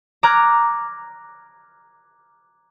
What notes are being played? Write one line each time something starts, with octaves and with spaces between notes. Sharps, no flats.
A#5 D6 F6 F#6 G#6